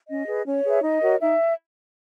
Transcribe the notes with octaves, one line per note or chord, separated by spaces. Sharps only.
C#4 D#5
G#4 B4
C#4 C#5
G#4 B4
E5
D#4 D#5
F#4 A#4 C#5
D#4 E5